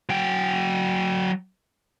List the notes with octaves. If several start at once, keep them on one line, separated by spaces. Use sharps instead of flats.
F#3 G5